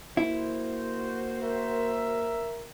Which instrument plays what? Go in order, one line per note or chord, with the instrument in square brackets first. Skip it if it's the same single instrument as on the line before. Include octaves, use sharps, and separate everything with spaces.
[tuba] A#3 [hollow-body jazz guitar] E4 [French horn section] F#4 C5
[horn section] A#4 E5